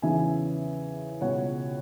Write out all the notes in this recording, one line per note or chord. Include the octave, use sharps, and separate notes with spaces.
E2 C#3 E3 E5 G#5
C#2 B2 C#5 F#5